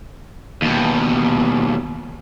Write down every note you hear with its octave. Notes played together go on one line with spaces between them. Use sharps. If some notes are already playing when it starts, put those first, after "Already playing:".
D#2 B2